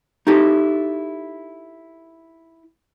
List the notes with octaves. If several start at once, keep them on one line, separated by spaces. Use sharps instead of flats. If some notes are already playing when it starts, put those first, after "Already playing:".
D#4 E4 G4 A4